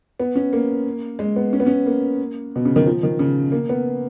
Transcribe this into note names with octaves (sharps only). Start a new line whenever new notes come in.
B3
C#4
A#3
G#3
B3
C#4
B3
C#4
A#3
B2
C#3
D#3
F3
D#3
C#3
A#3
B3